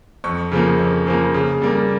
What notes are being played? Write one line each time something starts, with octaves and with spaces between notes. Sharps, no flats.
F2 C#6
C#3 F3 A#3
F2
C#3 F3 A#3
C#3
G3 A#3